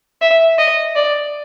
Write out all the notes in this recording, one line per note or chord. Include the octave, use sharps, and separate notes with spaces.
E5
D#5
D5